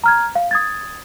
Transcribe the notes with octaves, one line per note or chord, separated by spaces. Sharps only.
A#5 F6 G#6
F5
D#6 G#6 A6